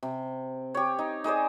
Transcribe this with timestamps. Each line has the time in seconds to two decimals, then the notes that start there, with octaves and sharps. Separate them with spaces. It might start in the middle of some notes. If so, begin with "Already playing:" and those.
0.03 C3
0.74 G4 C#5
0.99 D#4
1.24 D#4 G#4 C5 D5